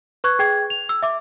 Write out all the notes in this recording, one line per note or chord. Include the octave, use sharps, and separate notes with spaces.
B4 C#6 F#6 G#6
G#4 G5 G#6
F7
E6
E5 D6